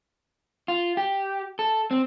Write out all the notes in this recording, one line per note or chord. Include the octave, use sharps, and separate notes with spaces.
F4
G4
A4
C4